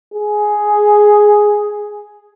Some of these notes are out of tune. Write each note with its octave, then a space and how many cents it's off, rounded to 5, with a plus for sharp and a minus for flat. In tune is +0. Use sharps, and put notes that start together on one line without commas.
G#4 +5